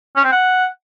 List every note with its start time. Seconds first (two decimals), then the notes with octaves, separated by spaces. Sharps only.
0.16 C#4
0.24 C4
0.32 F#5